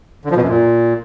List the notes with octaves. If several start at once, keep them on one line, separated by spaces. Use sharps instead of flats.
D3
F3
B2
F#2
A#2